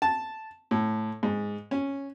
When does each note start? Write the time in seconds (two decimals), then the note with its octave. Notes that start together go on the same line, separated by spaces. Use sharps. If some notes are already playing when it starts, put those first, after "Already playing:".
0.02 A5
0.71 A2
1.23 G#2
1.71 C#4